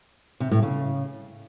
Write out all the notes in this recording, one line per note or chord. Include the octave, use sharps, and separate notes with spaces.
C3
A2
C#3